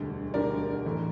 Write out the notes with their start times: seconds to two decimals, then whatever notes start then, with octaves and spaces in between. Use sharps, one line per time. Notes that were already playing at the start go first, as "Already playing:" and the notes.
Already playing: E1 D2 D3 G3
0.34 E1 D2 D3 G3 A#4 D5
0.85 A2 E3 A3